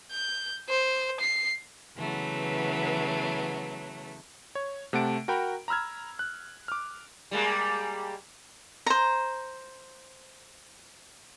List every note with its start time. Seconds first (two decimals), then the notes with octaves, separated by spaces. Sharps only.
0.11 G6
0.69 C5
1.20 C7
1.97 C#3 E3 F#3 A3 B3
4.55 C#5
4.93 C3 A3 F#5 A5 D7
5.28 F#4 A#4 G5 A#5 B5
5.68 A#5 B5 E6 F6 G#6
6.19 F#6
6.68 D6 F6
7.31 G3 G#3 A#3
8.86 C5 A#5